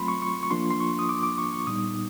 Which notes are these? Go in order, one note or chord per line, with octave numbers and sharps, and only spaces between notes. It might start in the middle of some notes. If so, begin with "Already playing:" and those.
Already playing: F#3 A3 C4 F4 B5 C6
C#6
C#6
C#6
F3 A#3 D4 F4 C6
C6
C#6
D#6
D6
D6
C#6
C#6
A#2 G3 B3 D#4 D#6